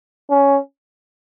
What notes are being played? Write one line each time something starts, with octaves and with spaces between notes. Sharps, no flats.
C#4